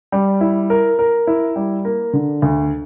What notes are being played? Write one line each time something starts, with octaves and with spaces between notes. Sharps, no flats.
G3
E4
A#4
A#4
E4
G3
A#3
D3
D2